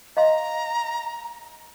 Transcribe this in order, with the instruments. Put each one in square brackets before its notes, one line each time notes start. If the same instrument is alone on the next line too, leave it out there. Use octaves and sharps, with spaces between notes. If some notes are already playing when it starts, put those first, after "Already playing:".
[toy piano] D#5 F5 C6 [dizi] A#5